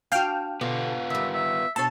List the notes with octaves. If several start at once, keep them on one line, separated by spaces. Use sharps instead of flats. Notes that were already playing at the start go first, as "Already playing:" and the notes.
D4 F#4 F5 G5 F6
B2 D3 B3 F4 G4
D#3 G3 E5
E5
B2 D4 A4 C#5 A5